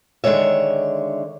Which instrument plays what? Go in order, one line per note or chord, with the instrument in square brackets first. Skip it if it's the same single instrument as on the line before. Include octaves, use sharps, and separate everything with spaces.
[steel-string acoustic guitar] D3 D#3 G#3 C#5 E5